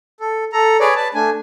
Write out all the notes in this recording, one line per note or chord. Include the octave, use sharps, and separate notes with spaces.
A4
A4 A#5
G#4 B4 C#5 D5
B4 A5
A3 D4 G#5